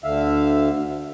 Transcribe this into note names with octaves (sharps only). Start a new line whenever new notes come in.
D2 D3 E5 F5